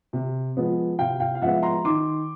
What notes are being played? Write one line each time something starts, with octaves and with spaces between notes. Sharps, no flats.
C3
F3 G#3 B3
C3 F5 G5
F5 G5
F5
F3 G#3 B3 E5 F#5
A#5 C6
D#3 C6 D6